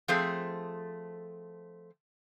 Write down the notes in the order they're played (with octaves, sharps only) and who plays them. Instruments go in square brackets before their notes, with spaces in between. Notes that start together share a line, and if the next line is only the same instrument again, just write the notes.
[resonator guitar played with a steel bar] F3 A3 C4 G#4 A4